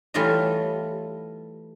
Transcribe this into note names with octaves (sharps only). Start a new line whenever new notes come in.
E3 G3 A3 F4 C#5 D#5